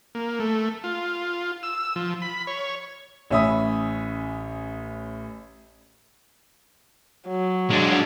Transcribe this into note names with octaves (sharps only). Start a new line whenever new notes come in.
A#3
A3
F4
E6
F3
B5
C#5
A1 C#4 E5 B5 D#6
F#3
G#3 D4